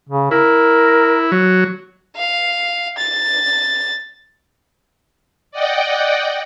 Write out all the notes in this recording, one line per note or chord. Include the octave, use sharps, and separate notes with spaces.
C#3
E4 A#4
F#3
F5
A6
D5 D#5 F#5 G5